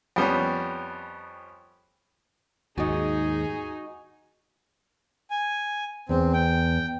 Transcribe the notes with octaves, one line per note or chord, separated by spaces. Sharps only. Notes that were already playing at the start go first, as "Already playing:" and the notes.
F2 G3 B3 C#4
D#2 G#2 D#4 F#4 G#4 D#5 G#5
G#5
E2 C4
G5